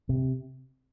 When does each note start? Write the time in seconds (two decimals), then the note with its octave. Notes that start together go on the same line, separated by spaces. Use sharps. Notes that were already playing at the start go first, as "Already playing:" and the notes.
0.09 C3